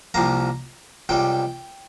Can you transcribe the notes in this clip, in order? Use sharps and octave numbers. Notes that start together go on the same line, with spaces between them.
C2 C3 F3 A#3 A#5
C#2 C3 G3 G5